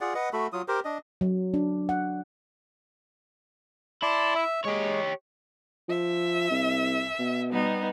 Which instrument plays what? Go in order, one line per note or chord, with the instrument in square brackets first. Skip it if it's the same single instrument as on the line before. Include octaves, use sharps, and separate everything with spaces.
[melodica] F4 G#4 D5 F#5
B4 D#5 F#5
A3 F#4 A4 B5
F#3 F4 D#6
G4 A#4 C5
D4 D#5
[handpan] F#3
D4
F#5
[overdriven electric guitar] E4 [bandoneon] D5 A5 C6
[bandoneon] E5
[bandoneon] G#3 [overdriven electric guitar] G4 C#5
[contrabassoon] F3 [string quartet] E5
[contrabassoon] C2
B2
[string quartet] G3 B3 D#4